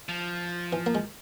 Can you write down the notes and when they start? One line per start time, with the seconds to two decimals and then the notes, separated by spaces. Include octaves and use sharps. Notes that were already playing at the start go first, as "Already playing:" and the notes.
0.09 F3
0.73 E3
0.86 A#3
0.95 G#3